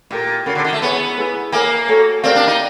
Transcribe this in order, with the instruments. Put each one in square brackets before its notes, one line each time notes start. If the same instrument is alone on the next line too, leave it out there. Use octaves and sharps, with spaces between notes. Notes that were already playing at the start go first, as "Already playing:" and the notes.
[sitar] A#2 [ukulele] E4 G4 A#4
[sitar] C#3 [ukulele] C#4 F#4 A#4
[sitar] D3
D#3
A3
[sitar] B3 [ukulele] E4 G#4 C#5
[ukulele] E4 G#4 B4
[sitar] A#3 [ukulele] A#4 C#5 E5 G#5
[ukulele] F#4 A4 C#5
[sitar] C4 [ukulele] G4 A#4 D5 F5
[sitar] D4
D#4